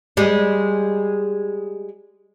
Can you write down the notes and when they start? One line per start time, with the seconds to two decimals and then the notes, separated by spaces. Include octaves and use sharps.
0.17 G3 G#3